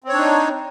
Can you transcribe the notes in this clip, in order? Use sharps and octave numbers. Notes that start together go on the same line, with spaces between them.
C4 D4 D#4 C#5